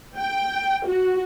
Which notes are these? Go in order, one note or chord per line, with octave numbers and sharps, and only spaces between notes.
G5
F#4